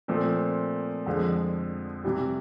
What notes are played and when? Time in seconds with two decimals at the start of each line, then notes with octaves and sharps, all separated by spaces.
0.08 A#2 F3 A3 C4
1.06 F2 D3 F3 G#3
2.04 C3 E3 G3